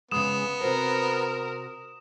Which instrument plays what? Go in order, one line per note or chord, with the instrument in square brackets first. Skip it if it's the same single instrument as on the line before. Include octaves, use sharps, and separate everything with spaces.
[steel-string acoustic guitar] C#3 G#3 [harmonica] B3 [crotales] D#6 E7
[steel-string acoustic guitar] C3 F#4 C5 [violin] A#4